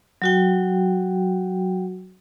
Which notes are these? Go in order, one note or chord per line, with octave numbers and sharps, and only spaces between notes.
F#3 F#4 G5